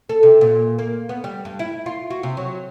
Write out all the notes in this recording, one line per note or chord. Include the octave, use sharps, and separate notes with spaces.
A4
C3
A#2
A#3
B3
G3
G2
E4
F4
F#4
C3
F#3